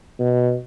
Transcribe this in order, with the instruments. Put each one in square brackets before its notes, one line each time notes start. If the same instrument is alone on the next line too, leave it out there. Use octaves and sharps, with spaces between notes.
[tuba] B2